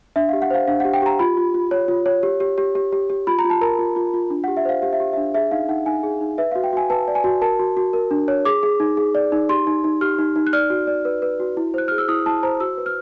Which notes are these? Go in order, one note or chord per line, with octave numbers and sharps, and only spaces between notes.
D4 E5
F5
G4
F#5
C5 F5
D4 F5
F#5
G4
G5
G4 A#5
F4 B5
F4
F4
C#5
F4
C#5
G4
G4
G4
G4
G4
G4
F4 B5
A#5
F4
A5
A#4 A#5
F4
F4
F4
D4
F#5
G4
E5
C5 F5
G4 F5
E5
G4
E5
D4
G#4 E5
D#4 F5
D#4 F#5
D#4 G#5
G#4
D#4
B4 E5
F5
F#4
G5
F#4 G#5
B4 A5
D5
G#5
F#4
A#4 A5
F#4
F#4
A#4
D4
C#5
G#4 D6
G#4
D#4
G#4
D5
D#4
G4 C6
D#4
D#4
G4 F6
D#4
D#4
F#6
D5 F6
F#4
D5
B4
B4
F#4
E4
C5 F#6
G#4 F6
E6
E4 D#6
E4 A5
C5 A#5
F#4 E6
B4
F6